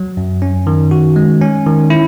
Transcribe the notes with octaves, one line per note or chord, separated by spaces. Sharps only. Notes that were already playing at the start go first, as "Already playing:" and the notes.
Already playing: F#3
F#2
C#4
D#3
F#4
G#3
C#4
D#3
E4